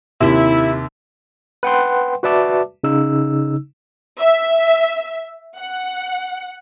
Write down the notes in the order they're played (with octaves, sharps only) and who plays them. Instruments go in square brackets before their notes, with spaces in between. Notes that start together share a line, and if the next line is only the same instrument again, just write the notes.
[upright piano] D#2 C3 [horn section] E4
[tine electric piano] B4 F#5 G5 C6
F#4 B4 D5 E5 A5 D6
C#3 D#4 E6
[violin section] E5
F#5